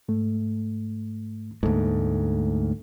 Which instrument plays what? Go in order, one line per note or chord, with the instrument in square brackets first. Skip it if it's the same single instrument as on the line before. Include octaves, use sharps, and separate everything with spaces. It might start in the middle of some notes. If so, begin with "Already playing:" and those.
[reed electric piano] G#2 A3
[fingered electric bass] D2 G#2 [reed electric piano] A3 A#3 A4